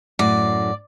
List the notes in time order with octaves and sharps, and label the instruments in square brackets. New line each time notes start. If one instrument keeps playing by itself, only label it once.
[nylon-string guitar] F#2 A2 [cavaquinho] D5